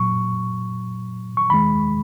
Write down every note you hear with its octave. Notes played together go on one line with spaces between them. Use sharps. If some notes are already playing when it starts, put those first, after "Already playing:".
Already playing: A#2 F#3 C#6
C#6
D#2 D#3 G#3 B5